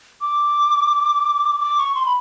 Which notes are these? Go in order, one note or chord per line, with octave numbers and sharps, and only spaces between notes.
D6
D6
C#6
C6
B5